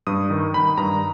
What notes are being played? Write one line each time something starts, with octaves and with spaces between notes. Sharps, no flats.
G2 D#6
D#3
D#3 B5
G2 A#5